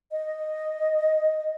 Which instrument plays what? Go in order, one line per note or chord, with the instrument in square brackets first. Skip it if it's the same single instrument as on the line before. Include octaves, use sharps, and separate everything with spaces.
[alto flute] D#5